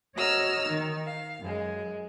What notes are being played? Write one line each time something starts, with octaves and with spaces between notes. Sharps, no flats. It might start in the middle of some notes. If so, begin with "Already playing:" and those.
F#4 C#5 D#5 A#5 E6 F6
D#3 D#4
F5
F#2 G#3